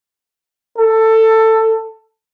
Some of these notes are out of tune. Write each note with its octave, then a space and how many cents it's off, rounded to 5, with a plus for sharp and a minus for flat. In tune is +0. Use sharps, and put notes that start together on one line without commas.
A4 +15